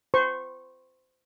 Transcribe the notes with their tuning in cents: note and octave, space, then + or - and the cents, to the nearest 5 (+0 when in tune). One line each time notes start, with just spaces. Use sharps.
C5 -25 C#6 -25